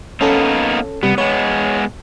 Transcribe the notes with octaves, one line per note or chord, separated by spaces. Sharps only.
A#3 B3 C#4 D#4 A4
C3 G3 B3
G#3 B3 C#5